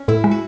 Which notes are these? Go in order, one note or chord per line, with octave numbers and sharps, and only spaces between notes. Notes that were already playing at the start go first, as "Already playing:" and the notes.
Already playing: C#4
A2 E4
G#3
F#4